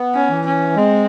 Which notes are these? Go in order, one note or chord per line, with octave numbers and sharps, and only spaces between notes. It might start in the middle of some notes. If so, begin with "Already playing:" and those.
Already playing: B3
C#4
E3
C#4
G#3 C4